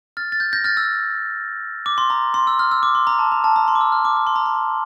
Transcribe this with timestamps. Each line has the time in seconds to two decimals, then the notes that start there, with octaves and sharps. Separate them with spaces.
0.17 F6 A6
0.32 A6
0.40 G6
0.53 G6 A#6
0.64 F6 A6
0.77 E6
1.86 D6
1.98 C6
2.10 A#5
2.34 C6
2.47 E6
2.59 F6
2.71 E6
2.83 D6
2.95 C6
3.07 A#5
3.19 A5
3.32 A#5
3.44 A5
3.56 A#5
3.68 C6
3.75 D6
3.81 E6
3.92 F6
4.05 D6
4.17 D6
4.27 C6
4.36 A#5
4.46 C6